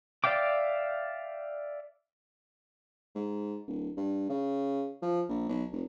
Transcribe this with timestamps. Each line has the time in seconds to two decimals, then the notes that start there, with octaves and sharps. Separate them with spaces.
0.24 D5 E5 F5 G5 D6
3.15 G#2
3.67 D1
3.97 G2
4.29 C#3
5.02 F3
5.29 A#1
5.49 B1
5.72 F1